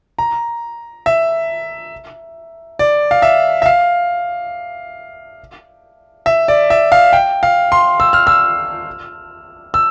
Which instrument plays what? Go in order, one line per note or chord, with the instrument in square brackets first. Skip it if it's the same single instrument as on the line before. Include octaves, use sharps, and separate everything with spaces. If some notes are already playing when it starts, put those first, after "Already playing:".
[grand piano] A#5
E5
D5
F5
E5
E5
F5
E5
D5
E5
F5
G5
F5
C6
E6
F6
E6
E6